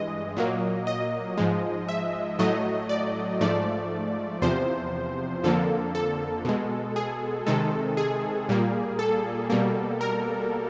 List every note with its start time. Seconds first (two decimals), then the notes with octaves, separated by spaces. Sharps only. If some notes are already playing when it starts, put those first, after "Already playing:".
Already playing: G2 E3 G#3 D#5
0.37 A#2 F#3 A#3
0.87 D#5
1.37 G#2 F3 G#3
1.89 E5
2.39 A2 F#3 A3 D#5
2.89 D5
3.41 G#2 F3 A3 D5
4.42 E2 C3 F3 C5
5.44 F2 D3 F3 A#3 A4
5.95 A4
6.45 B2 G#3
6.96 G#4
7.47 C3 D#3 G#3 A4
7.97 G#4
8.49 A#2 G3 A#3
8.99 A4
9.50 B2 G3 A#3
10.01 A#4